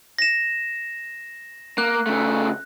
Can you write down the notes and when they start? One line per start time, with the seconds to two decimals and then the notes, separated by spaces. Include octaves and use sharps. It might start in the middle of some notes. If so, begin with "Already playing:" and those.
0.19 A#6 E7
1.78 A#3 F#6
2.06 C#3 A3